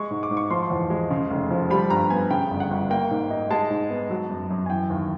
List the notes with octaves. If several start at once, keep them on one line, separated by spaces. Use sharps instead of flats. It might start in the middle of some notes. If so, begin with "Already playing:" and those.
Already playing: G#3 C#6
G#2
D6
G#2
C#6
F3 C6
E2
G#3
C#3
F1
F3
G3 B5
G2 A#5
B3 G#5
C#3 G5
G1
F#5
G1
A#3 G5
G#2
D#4
G#3 A5
G#2
B3
F#3
F#2
F#2
G#5
E3 G5
D#2